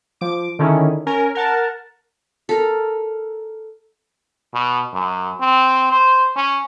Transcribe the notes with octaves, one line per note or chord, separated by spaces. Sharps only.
F3 D6
D3 D#3 C#4 E4 G#4
C#4 A#4 G#5
A#4 F#5 A5
A4 A#4
B2
F#2
C4
C5
C#4